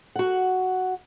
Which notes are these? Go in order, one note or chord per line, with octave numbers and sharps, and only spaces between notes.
F#4 F#5